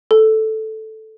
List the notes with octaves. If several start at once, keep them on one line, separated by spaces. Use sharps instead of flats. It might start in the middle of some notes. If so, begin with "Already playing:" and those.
A4